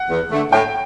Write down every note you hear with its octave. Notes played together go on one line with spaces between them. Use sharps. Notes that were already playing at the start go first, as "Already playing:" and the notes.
Already playing: F#5
E2
D3 A3
A2 G5